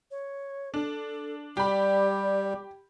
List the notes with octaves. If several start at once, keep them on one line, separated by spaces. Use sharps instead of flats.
C#5
D4 A4
G3 G4 D5 B5